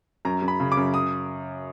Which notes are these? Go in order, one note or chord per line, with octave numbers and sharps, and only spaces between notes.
F#2 A#5
F#2
B5
C#3
D6
F#2
D#6